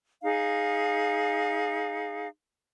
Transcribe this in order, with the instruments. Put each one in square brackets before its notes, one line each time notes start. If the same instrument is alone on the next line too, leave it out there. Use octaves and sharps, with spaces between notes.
[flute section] D#4 G#4 F5